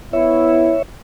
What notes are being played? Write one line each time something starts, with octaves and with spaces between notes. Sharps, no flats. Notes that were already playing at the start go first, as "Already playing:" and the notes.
B3 E4 C#5 E5